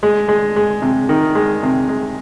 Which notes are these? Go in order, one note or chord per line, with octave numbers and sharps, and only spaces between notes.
G#3
G#3
G#3
C3
D#3
G#3
C3
G#3